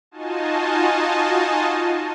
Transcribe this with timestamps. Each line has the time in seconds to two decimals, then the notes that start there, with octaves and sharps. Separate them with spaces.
0.11 D#4 F4 F#4 D#5 G#5 A5